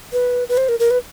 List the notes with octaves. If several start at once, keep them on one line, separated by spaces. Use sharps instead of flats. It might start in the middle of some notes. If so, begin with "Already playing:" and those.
B4
B4
C5
A#4
A#4
B4